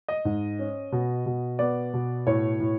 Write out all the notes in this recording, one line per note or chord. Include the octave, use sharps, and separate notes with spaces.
D#5
G#2
C#4
B2
B2
B3 D5
B2
A2 C#5
A2